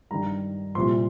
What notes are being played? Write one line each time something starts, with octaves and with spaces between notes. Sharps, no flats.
G2 D#3 A#5
C2 A#2 F3 C6